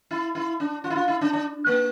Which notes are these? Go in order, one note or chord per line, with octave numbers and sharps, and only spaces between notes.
E4
E4
D4
F4
E4
F4
E4
D4
D4
A#3